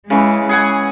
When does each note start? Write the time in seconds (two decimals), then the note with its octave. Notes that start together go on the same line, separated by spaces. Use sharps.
0.10 C#3 E3 G#3
0.49 G#4 F#5 G#5